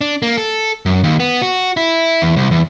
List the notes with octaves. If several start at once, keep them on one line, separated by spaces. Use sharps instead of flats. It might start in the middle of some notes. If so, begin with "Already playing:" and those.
D4
A#3
A4
F#2
D#2
B3
F#4
E4
E2
C2
E2